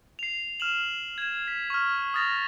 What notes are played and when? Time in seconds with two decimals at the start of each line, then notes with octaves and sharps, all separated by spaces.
0.19 C7 F7
0.60 F6 E7 F#7
1.18 G#6 E7
1.48 B6
1.70 C#6 F6
2.14 D#6 F6 A6 A#6 F7